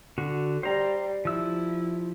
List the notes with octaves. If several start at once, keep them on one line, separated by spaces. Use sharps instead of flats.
D3 F#4
G3 C5 A#5
F3 E4 E6